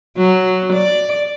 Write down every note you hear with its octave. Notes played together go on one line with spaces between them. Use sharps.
F#3
D5